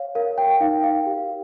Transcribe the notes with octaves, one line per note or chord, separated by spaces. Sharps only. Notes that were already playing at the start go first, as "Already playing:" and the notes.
Already playing: C#5 F5
A#4 F5
G5
D#4 F5
F5
G4